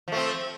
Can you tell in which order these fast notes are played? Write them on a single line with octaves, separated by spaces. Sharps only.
F3 A3 C4